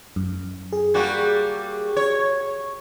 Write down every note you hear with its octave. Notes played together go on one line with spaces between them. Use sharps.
F#2
G#4
G3 A#3 F#4
C#5